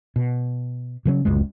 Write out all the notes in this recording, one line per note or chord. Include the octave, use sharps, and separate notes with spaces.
B2
C#3 F#3 G#3 C#4
D1 C#2 F#2 G#3